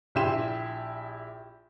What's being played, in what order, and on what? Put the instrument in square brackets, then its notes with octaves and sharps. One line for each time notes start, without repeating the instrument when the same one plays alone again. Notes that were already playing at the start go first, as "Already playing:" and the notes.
[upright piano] A#1 E4 G4 C6 E7